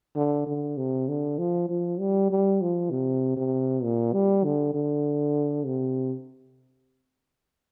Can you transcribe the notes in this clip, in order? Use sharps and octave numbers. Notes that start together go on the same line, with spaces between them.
D3
D3
C3
D3
F3
F3
G3
G3
F3
C3
C3
A#2
G3
D3
D3
C3